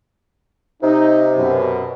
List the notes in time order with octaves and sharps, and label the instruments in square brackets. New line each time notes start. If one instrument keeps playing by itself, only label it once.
[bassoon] C3 [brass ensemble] D#4
[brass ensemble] F#2 B2